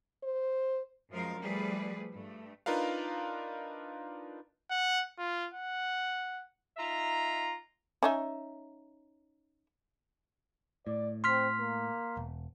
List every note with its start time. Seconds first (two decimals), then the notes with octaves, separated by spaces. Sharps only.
0.23 C5
1.11 F#2 F3 G#3 A#4 F5
1.40 F3 G3 A3 G#4 B4 D5
2.13 G2 A3
2.66 D4 D#4 F4 A#4 B4 F5
4.70 F#5
5.18 F4
5.54 F#5
6.77 D#4 F4 E5 A#5
8.03 C#4 D#4 E5
10.87 A2 D5
11.24 C4 C6 F6 B6
11.60 A#3
12.17 E1